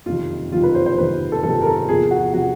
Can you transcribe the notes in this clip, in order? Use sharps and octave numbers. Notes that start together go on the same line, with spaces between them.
F#1 F2 C3 D#3 F4
F#1 F2 C3 D#3 F4
B4
C5
C5
F#1 F2 C3 D#3 B4
A4
F#1 F2 C3 D#3 A4
A#4
A4
E2 C3 F3 G#4
F#4
C3 F3 F#4